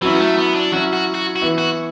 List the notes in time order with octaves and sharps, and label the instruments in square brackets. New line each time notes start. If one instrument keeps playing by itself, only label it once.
[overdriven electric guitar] E3 [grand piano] F#3 C#4 E4
[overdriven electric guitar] B3
A3
B3
D4
[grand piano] F#3 C#4 E4 [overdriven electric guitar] F#4
[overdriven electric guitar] F#4
F#4
F#4
[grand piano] E3 B3 E4
[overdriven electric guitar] F#4